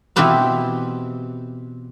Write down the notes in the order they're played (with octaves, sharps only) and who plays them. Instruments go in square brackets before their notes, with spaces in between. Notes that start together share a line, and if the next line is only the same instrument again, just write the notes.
[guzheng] B2 E3 C4 G4 B4 F5